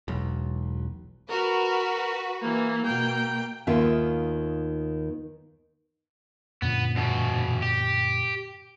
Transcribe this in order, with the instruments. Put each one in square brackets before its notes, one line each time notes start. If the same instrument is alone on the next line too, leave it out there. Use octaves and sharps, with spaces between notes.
[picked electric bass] E1 B1
[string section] F#4 B4 [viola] A#4
[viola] E3 A#3
[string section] B2 [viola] A#3 G5
[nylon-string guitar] D#2 D#3 B3 F4 E5
[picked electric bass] F#2 A#2 D3 [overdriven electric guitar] B3
[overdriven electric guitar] E2 B2
G4